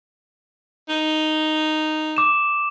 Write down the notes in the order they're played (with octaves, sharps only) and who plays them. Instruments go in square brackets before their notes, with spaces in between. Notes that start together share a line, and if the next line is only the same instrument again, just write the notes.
[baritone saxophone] D#4
[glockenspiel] D6 E7